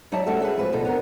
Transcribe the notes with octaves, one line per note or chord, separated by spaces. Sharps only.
F#3 D#4 C#5 D5 E5 A5
G3 A3 C#4 F#4 A4 E5
C#4 F#4 G#4 B4
G#2 F3 C4 B4
D2 B2 F3 D#4 A4
B3 D4 A#4